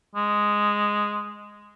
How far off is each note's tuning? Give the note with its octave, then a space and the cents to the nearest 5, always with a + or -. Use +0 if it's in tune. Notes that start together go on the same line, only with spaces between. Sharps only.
G#3 -5